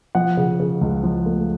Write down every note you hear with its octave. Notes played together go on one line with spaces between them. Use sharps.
F3 F#5
C#3
C#3
C#2
F3
A3